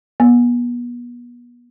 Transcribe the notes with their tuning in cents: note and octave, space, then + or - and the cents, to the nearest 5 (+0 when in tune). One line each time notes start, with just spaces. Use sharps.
B3 -35